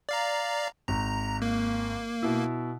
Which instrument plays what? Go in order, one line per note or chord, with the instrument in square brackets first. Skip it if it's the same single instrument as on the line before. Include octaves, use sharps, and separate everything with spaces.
[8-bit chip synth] D5 F5 A#5
[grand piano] G#1 [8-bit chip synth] A#5
[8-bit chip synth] A#3
[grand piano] B2 E4